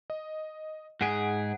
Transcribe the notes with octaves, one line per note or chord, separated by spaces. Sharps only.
D#5
G#2 G#4 F#5 B6 D7